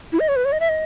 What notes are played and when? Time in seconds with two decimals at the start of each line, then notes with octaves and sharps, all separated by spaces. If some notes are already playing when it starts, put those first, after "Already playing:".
0.13 E4
0.20 D#5
0.28 C#5
0.36 B4
0.45 C#5
0.52 D#5
0.60 E5
0.69 D#5